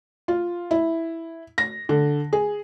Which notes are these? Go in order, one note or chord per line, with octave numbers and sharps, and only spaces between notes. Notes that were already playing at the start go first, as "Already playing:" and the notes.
F4
E4
A#6
D3
G#4